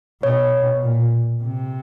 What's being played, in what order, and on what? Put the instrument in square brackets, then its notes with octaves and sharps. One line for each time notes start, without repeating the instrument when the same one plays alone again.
[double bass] B2 [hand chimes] C#5
[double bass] A#2
C3